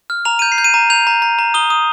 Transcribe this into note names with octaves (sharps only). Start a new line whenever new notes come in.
F6
A#5 F7
G6 D#7
C7
G6
D#7
A#5
G6 F7
A#5
A#5
A#5
D#6 G7
D#6